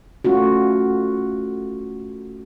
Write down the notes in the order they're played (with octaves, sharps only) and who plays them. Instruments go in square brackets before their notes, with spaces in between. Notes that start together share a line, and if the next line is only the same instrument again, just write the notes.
[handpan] A3 C#4 F4 F#4